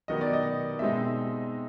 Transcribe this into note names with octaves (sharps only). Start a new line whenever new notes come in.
D#3 F#3 B3 D#5
D5
D#5
B2 G#3 C4 D#4 E5